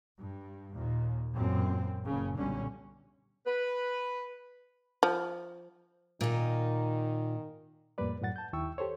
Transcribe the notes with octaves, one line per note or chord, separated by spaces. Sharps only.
G2
D#2 A#2
A1 F#2 A#2 C4
F#1 C#3
B1 A#2 D3 G3 C#4
B4
F3
A#2 D#3 D#4
F2 A2 G3 A#3 B4 D5
F#2 A2 F#3 F#5 A6
A5 G6
D#2 D#3 E4 G5 C#6 E6
G4 A4 C5 C#5